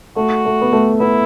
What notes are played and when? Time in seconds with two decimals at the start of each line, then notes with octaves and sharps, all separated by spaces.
0.16 A3 F#4
0.45 A3
0.61 B3
0.73 A3
1.00 B3 E4